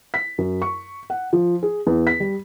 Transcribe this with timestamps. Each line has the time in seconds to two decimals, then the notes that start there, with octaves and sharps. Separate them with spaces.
0.14 B6
0.38 F#2
0.62 C#6
1.10 F#5
1.33 F3
1.63 G#4
1.87 E2
2.07 B6
2.20 G3